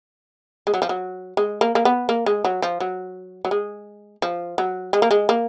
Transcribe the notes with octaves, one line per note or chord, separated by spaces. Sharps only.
G#3
F#3
F3
F#3
G#3
A#3
A#3
B3
A#3
G#3
F#3
F3
F#3
F#3
G#3
F3
F#3
G#3
A#3
G#3
A#3